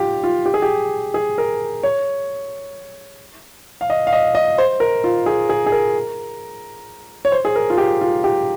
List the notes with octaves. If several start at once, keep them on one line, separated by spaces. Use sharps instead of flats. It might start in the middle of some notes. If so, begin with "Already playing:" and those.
Already playing: F4 G4
F4
G4
G#4
G4
G#4
A#4
C#5
F5
D#5
F5
D#5
D#5
C5
A#4
F4
G#4
G#4
G#4
A#4
C#5
C5
G#4
A#4
F4
G4
F4
G4